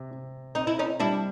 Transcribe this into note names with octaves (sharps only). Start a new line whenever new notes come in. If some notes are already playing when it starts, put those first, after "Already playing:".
Already playing: C3
C3
C4 D#4
E4
C#4 D#4
G3 D4 E4